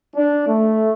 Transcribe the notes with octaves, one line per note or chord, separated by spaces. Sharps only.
D4
A3